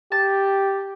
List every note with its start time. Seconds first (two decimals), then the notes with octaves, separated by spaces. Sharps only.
0.12 G4 A5